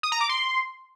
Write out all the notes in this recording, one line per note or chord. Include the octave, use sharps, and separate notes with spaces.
D#6
A#5
D6
C6